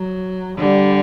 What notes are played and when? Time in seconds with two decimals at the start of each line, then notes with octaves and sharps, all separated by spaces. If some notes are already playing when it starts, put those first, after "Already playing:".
Already playing: F#3
0.58 D3 G3